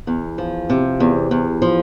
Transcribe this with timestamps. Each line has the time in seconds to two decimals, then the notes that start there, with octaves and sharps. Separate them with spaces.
0.07 E2
0.38 F3
0.70 C3
1.00 E2
1.31 E2
1.62 F3